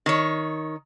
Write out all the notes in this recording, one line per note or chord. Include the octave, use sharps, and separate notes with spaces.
D#3 C#5